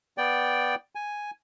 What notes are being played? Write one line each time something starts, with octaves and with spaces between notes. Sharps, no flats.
B3 D5 G5
G#5